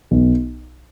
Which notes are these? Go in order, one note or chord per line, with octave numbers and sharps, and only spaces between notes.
B1